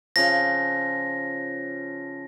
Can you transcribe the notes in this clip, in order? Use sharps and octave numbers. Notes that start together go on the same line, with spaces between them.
C#3 F3 A#6